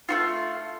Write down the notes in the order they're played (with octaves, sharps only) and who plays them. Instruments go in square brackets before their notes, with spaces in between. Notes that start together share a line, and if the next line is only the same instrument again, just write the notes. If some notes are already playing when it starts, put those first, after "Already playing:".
[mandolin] A3 C#4 F4